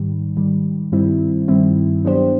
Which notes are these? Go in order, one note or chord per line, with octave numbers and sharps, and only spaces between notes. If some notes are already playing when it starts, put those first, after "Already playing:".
Already playing: G#2 D#3 G3
G#2 D#3 G3
G2 D#3 G3 C4 E4
G2 D#3 G3 C4 E4
F#3 B3 D4 G4 C5